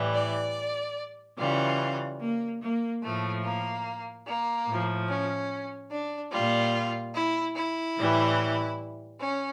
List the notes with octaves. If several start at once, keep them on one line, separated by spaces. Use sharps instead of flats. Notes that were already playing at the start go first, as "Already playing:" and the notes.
Already playing: A2 E3 G3
D5
C#3 E3 G3 F4
A#3
A#3
A2 F3 A3
A#3
A#3
A2
F3
C#4
D4
A#2 G3 F4
E4
E4
A2 E3 G3
C#4